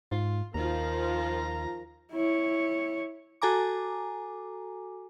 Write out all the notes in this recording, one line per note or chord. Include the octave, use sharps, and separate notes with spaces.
G#2 F4
D#2 D#3 F3 F4 A#5
E4 C#5
F#4 A4 G#5 A#5 D6